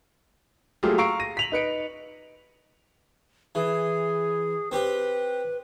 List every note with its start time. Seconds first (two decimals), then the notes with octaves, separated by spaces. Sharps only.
0.83 F#3 A3 A#3 F4 G4 G#4
0.98 F5 A#5 C#6 E6 C7 D7
1.20 A#6 D#7
1.37 B6 F7 F#7
1.52 D#4 B4 C#7 D7
3.55 E3 G#4
4.72 C4 G4 B4